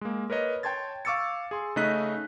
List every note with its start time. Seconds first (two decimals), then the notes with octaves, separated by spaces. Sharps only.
0.01 G#3 A#3
0.30 A#4 B4 C#5 D#5
0.63 C#5 G5 A5 C6 G#6 A6
1.05 F5 C#6 D6 E6 A6 C#7
1.51 G#4 C6
1.76 C#3 A3 D#4 D#5 F#6 B6